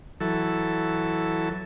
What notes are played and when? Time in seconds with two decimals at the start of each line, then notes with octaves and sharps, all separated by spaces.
0.21 E3 F#3 A4